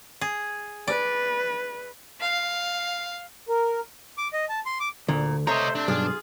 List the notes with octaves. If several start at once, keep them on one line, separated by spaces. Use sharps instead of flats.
G#4
B4 D5
F5
A#4
D6
D#5
A5
C6
D6
D2 A#2
C3 A3 C5 C#5 D#5 A#5
C4 D4
B1 G2 F4 G#4